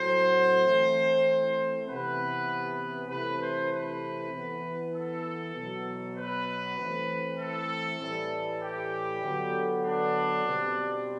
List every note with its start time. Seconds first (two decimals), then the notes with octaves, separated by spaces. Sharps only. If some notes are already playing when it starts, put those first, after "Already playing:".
Already playing: A2 F#3 C4 C5
0.64 E3 A3 C4
1.87 C3 E3 B3 B4
3.09 C3 E3 A3 C4 B4
3.40 C5
3.71 B4
4.32 E3 B3
4.93 A4
5.55 B2 F#3 B3
6.16 B4
6.77 E3 A3 C4
7.38 A4
8.00 A2 E3 G3
8.61 G4
9.23 D3 F#3 B3
9.84 D4
10.45 B2 G3 C4